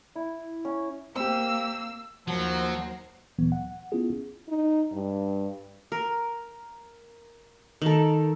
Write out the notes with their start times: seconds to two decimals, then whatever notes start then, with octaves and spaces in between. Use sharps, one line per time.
0.16 E4
0.65 C#4
1.16 A#3 C4 G4 E6
2.28 D#2 F3 F#3 A#4 C5 F#5
3.38 D2 A#2 E3 F#3 B3
3.52 F#5
3.92 B3 C#4 E4 F4 G#4
4.48 D#4
4.92 G2
5.92 A#4
7.82 D#3 A4